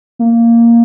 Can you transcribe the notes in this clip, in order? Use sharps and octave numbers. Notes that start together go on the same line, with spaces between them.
A#3